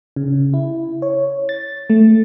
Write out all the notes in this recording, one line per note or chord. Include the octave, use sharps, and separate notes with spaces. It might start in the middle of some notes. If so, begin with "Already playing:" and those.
C#3
E4
C#5
A6
A3